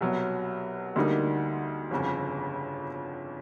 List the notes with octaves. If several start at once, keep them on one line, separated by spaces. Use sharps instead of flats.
C2 B2 F#3
D2 D3 G3 A#3 D#4
G1 F2 C#3